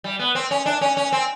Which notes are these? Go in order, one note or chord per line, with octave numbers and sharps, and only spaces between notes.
G3
B3
C4
C#4
D4
C#4
C#4
C4